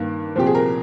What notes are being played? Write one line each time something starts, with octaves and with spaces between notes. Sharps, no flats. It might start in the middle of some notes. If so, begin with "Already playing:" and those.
Already playing: G2 D#3 A#3
C2 A#2 F3 C4 G4
G#4
A#4